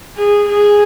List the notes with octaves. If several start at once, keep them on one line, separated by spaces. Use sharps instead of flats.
G#4
G#4